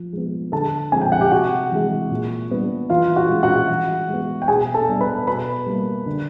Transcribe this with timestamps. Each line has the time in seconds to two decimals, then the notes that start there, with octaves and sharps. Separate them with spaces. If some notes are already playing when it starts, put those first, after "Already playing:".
Already playing: F3
0.13 G#3 B3
0.52 D3 A4 A5
0.92 F3 G#3 C4 G#5
1.02 G5
1.12 F#5
1.21 G4 G5
1.32 C3 F#4 F#5
1.72 E3 G#3
2.11 A#2
2.50 G3 B3 D4
2.90 E3 F4 F5
3.16 F#4 F#5
3.29 G#3 C#4
3.43 F#4 F#5
3.69 E3
4.09 G#3 B3
4.42 G5
4.48 B2 G#4 G#5
4.74 A4 A5
4.88 G3 B3 D4
5.01 B4 B5
5.27 B2 B4 B5
5.66 G3 A#3
6.06 D3